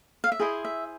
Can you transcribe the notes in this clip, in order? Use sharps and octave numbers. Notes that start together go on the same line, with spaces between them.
F5
E5
E4 G#4 C5 D#5
E5